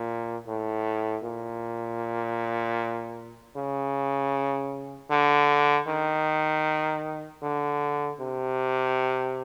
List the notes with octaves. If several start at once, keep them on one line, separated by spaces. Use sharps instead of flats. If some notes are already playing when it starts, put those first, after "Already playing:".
Already playing: A#2
A2
A#2
C#3
D3
D#3
D3
C3